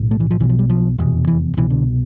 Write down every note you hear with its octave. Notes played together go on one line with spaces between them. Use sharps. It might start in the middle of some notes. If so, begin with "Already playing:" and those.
Already playing: B1 A2
A3
E3
F3
B1 B2 E3
F3
G3
F3
F1 E2 B2
E3
C2 B2 E3
D3